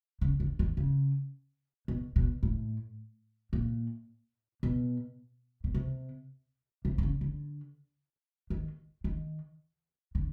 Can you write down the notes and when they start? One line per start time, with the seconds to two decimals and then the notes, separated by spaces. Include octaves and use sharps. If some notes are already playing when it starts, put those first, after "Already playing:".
0.21 C#3
0.40 D3
0.59 D#3
0.77 C#3
1.88 B2
2.16 B2
2.43 A2
3.53 A#2
4.63 B2
5.64 B2
5.74 C3
6.85 C3
6.98 C3
7.03 C#3
7.21 D3
8.50 D#3
9.04 D#3
10.15 D3